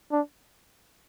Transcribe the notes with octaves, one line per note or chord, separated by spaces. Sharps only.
D4